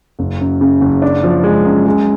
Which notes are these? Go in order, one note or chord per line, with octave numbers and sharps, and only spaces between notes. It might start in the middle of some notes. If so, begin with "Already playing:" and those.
F#1
F#2
C#3
F#1
D4
F3
G#3
F#2
G#3